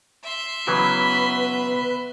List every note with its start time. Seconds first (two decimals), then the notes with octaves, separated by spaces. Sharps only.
0.23 E5 C6
0.68 C#3 E3 F#3 B3 B4